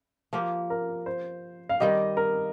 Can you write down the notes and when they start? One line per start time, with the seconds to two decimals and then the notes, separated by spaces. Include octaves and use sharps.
0.33 F3 A#3 G4
0.70 A#4
1.06 C5
1.69 F5
1.80 D#3 G3 C4 G4 D#5
2.17 A#4